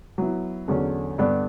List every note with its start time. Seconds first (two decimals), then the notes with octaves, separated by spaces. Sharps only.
0.18 F#3 B3 E4
0.68 E2 D3 F#3 C#4
1.18 G2 D3 G3 B3 D4